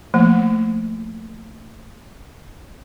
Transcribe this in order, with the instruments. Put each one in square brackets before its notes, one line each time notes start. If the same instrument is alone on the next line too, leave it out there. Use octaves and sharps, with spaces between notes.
[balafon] F3 A3 A#3